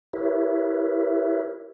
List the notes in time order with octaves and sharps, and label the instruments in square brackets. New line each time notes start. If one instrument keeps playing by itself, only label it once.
[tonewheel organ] E4 G4 A#4 B4 C#5 E5